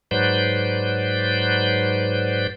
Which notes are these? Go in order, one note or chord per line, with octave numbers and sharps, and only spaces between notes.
G#2 F#3 B4 C5 D5 G6